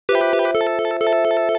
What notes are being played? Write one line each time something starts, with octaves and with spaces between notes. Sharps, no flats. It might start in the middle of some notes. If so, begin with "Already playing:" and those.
F4 G4 B4 C5 E5
A4
F4 A4 C5 E5